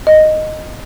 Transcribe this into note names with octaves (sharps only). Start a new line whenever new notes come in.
D#5